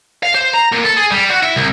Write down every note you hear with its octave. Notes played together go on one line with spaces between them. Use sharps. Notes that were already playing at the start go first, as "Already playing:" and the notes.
F5
C5
A#5
A#2
A4
G#4
G3
F#4
E4
C2